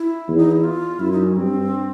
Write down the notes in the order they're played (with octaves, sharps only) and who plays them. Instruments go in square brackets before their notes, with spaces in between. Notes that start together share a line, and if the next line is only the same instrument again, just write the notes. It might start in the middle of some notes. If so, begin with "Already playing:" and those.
Already playing: [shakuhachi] E4
[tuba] E2
[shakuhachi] D#4
E4
F4
[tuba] F#2 [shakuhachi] E4
[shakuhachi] D#4
C#4
[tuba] G2 [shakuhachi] C4